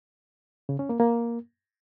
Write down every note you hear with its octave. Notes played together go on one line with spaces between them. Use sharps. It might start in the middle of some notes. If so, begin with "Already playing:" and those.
C#3
C#4
A#3
A#3